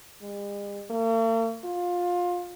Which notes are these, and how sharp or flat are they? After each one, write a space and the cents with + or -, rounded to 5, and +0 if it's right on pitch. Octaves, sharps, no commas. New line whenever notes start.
G#3 -45
A#3 -45
F4 +20